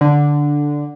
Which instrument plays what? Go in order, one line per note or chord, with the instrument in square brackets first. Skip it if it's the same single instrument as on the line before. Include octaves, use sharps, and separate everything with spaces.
[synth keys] D3